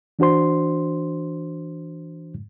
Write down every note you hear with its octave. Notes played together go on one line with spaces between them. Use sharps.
E3 D4 F#4 C5 C6